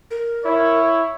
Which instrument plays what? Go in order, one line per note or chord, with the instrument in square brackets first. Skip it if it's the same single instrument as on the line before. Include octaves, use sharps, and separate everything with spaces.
[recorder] A#4
[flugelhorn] E4 [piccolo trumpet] C#5